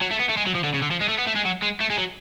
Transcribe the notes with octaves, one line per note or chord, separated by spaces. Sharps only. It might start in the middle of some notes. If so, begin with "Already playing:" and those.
F#3
A3
B3
A3
G#3
F#3
F3
D3
C#3
D3
F3
G#3
A3
B3
A3
G#3
F#3
G#3
A3
G#3
F#3